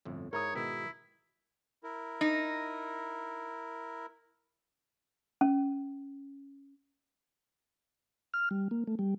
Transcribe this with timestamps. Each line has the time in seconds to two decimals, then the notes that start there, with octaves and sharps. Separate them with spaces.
0.05 G1 F2 A2
0.33 G#2 E4 A#4 C#5 A#5 D#6
0.55 G#2 B2 D#3 E4
1.83 E4 A#4
2.21 D#4
5.41 C#4
8.34 F6
8.51 G3
8.71 A#3
8.87 A3
8.99 G3